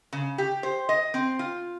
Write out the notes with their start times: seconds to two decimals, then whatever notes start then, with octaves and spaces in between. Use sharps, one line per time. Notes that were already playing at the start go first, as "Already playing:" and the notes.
0.13 C#3
0.38 G4
0.63 C5
0.89 D#5
1.14 C4
1.39 F4